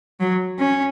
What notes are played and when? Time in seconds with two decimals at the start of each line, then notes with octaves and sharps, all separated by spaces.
0.20 F#3
0.59 C#4